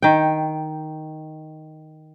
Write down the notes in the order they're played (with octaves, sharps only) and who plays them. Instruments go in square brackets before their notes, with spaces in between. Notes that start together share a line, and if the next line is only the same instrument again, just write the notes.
[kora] D#3 G5